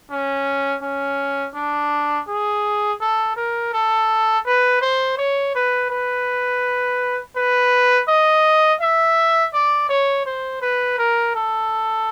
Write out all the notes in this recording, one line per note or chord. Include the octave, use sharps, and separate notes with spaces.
C#4
C#4
D4
G#4
A4
A#4
A4
B4
C5
C#5
B4
B4
B4
D#5
E5
D5
C#5
C5
B4
A#4
A4